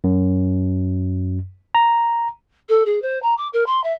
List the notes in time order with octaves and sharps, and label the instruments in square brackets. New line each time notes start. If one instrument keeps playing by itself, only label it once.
[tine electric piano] F#2
A#5
[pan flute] A4
G#4
C5
A#5
D6
A#4
C6
E5